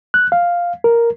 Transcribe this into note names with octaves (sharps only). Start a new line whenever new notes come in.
F#6
F5
A#4